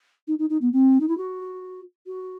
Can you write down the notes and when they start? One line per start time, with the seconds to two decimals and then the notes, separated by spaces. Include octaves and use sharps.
0.28 D#4
0.39 D#4
0.50 D#4
0.61 B3
0.73 C4
1.00 D#4
1.08 E4
1.18 F#4
2.07 F#4